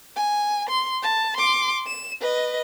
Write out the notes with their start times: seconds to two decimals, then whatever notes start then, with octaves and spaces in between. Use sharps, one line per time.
0.16 G#5
0.69 C6
1.02 A5
1.37 C6 D6
1.87 E7
2.21 B4 D#5